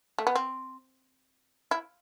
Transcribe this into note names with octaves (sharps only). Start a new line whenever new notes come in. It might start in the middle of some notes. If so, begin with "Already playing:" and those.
A3
B3
C4
E4